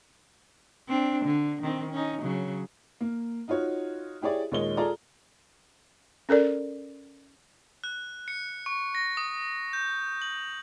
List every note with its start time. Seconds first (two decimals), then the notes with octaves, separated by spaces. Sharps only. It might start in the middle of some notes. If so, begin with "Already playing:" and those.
0.88 C4 D4
1.25 D3
1.62 D#3 C4
1.91 C#4 D#4
2.22 C#3 F#3
3.01 A#3
3.48 D#4 F4 F#4 C#5
4.22 E4 G4 G#4 C#5 D5
4.52 D#2 A#2 G#3 C#5 D#5 G7
4.77 F4 G#4 A4 D5 A#5
6.29 C#4 A4 A#4 D5
7.84 F#6
8.28 C#7
8.66 C#6
8.95 A#6
9.17 D#6
9.73 G6
10.22 F#7